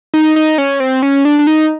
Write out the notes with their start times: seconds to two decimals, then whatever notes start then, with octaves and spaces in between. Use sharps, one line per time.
0.14 D#4
0.36 D#4
0.58 C#4
0.80 C4
1.03 C#4
1.25 D4
1.39 D4
1.47 D#4